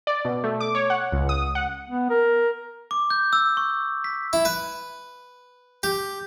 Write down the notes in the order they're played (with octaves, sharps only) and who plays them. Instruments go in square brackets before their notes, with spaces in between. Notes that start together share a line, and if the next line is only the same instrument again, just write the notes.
[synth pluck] D5
B2
A3
D6
C#5
F#5
C#2
D#6
F#5
[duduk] B3
A#4
[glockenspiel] D6
G6
E6
C#6
B6
[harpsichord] E4
B4
G4